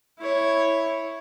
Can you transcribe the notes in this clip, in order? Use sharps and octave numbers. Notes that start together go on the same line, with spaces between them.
E4 C#5